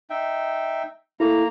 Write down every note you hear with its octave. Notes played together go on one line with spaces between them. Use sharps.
D#4 E5 G5
A#3 E4 A4 A#5